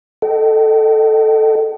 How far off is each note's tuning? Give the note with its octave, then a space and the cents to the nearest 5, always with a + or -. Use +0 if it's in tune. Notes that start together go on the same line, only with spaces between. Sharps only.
A4 +0 D#5 -15 G5 -40